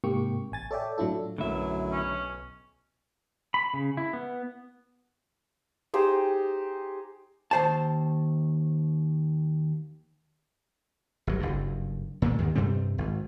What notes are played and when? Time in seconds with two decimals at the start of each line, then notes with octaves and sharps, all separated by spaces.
0.04 G#2 C3 A#3 G4 C#6
0.52 A1 G#5 A6
0.71 A4 C#5 D5 E5 G5
0.98 A2 F#3 D4 E4 F4 A4
1.38 B1 F#2 B2 D3 F#3 A3 E4 E5
1.92 C#4
3.54 B5
3.74 C#3
3.97 E4
4.13 B3
5.94 D#4 G4 G#4 C5
7.51 D#2 C5 A5
11.27 G1 F#3
11.40 F#1 G2
12.22 A#2 D3 F3 A3
12.39 D#2 G#2 D#3
12.55 G2 C3 G3 C4
12.98 G#1